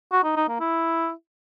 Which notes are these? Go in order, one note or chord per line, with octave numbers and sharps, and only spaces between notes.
F#4
D#4
D#4
A#3
E4